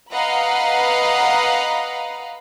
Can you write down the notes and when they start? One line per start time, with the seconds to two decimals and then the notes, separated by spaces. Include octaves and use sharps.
0.11 B4 D#5 F5 F#5 A#5 B5